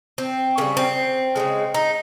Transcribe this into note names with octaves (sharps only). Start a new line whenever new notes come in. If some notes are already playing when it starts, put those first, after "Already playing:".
C4
C#3 G3 A#3
C4
C#3 F3 G#3
D#4